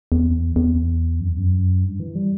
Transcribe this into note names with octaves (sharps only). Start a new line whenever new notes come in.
E2
E2
F#2
E2
F#2
G2
E3
G3